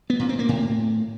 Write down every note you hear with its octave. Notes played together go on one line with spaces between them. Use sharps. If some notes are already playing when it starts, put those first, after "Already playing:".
B3
A#2
C4
A#3
A2